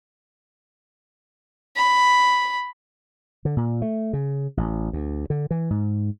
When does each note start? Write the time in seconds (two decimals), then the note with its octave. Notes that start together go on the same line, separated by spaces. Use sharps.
1.76 B5
3.45 D3
3.57 A#2
3.82 A3
4.13 C#3
4.57 A1
4.93 D2
5.30 D3
5.51 E3
5.70 G#2